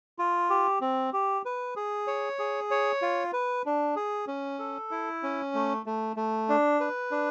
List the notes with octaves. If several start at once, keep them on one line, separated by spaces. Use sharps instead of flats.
F4
G4
C4
G4
B4
G#4
C#5
G#4
C#5
F4
B4
D4
G#4
C#4
A4
E4
C#4
A3
A3
A3
D4
B4
D4